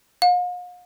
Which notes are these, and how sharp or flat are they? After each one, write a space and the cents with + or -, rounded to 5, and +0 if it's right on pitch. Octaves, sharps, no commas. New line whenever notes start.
F5 +45